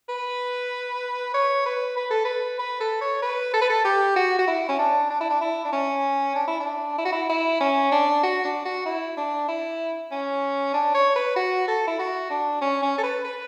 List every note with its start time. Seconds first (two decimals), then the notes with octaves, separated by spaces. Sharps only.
0.09 B4
1.34 C#5
1.66 B4
1.97 B4
2.11 A4
2.25 B4
2.59 B4
2.80 A4
3.01 C#5
3.22 B4
3.53 A4
3.61 B4
3.70 A4
3.84 G4
4.16 F#4
4.39 F#4
4.48 E4
4.69 C#4
4.79 D4
5.10 D4
5.21 E4
5.30 D4
5.41 E4
5.65 D4
5.73 C#4
6.35 D4
6.48 E4
6.60 D4
6.98 E4
7.05 F#4
7.12 E4
7.29 E4
7.60 C#4
7.92 D4
8.23 F#4
8.44 D4
8.65 F#4
8.86 E4
9.17 D4
9.48 E4
10.11 C#4
10.74 D4
10.95 C#5
11.16 B4
11.36 F#4
11.68 A4
11.87 E4
11.99 F#4
12.30 D4
12.61 C#4
12.83 C#4
12.98 A4
13.03 B4
13.24 B4